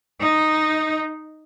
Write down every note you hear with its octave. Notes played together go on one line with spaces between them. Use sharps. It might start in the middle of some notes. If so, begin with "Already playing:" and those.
D#4